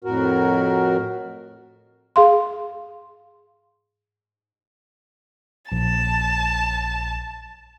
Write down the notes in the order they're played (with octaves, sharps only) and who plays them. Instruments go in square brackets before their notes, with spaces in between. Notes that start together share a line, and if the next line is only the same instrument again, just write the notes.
[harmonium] F2 A2 F#4 A#4
[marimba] G#4 F5 C6
[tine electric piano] A#1 [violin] A5